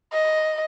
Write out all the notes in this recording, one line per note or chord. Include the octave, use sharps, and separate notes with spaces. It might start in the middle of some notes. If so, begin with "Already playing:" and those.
D#5